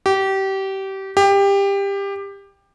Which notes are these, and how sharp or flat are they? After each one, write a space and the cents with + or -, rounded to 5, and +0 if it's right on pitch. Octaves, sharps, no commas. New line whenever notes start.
G4 -25
G4 +20